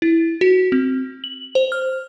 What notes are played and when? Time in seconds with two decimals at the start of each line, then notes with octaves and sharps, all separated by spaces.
0.02 E4
0.41 F#4
0.72 C4
1.24 F#7
1.55 C5
1.72 F6